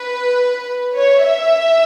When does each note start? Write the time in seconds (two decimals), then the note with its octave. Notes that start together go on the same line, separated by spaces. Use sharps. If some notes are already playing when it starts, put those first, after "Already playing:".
Already playing: B4
0.97 C#5
1.26 E5